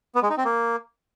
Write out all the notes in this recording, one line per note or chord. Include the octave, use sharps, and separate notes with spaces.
B3
G#3
D#4
C4
A#3